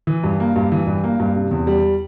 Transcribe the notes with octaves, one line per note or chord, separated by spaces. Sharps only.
E3
G2
A#3
G2
E3
G2
A#3
G2
C3
E2
G3